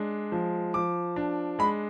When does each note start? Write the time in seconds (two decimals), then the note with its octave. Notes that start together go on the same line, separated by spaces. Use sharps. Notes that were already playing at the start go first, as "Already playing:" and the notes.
Already playing: G#3 D4
0.32 F3
0.74 F3 D6
1.16 D4
1.59 G#3 B5